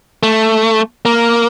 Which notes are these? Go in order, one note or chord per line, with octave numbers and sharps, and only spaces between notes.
A3
A#3